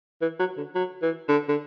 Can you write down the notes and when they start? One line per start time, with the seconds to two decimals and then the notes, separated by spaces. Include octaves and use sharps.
0.22 E3
0.39 F#3
0.57 D3
0.75 F#3
1.02 E3
1.29 D3
1.49 D3